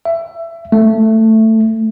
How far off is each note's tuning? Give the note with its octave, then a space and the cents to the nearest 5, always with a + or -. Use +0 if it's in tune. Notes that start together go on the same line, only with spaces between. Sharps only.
E5 +20
A3 +10